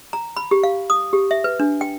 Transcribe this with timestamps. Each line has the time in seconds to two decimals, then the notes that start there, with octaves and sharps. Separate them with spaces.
0.13 A#5
0.37 B5
0.51 G4
0.63 F5
0.90 D#6
1.13 G4
1.31 E5
1.44 B4
1.60 D4
1.81 G5